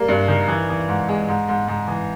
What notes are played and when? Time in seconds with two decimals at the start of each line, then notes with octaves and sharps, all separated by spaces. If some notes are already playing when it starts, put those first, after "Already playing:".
Already playing: G3 A#3
0.08 G2
0.28 D#3
0.48 E3
0.69 E3
0.89 G#2
1.09 G#3
1.28 G#2
1.49 G#2
1.68 G#2
1.88 E3